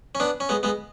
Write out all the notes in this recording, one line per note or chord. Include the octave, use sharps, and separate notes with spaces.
C#4
B3 D4
C#4
G#3 B3
G#3 B3